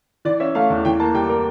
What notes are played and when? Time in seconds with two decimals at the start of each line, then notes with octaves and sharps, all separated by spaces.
0.25 E3 D5
0.40 C#4 E5
0.55 A3 F5
0.70 E2
0.85 E3 G5
1.00 A#3 A5
1.15 G3 G5
1.29 A#4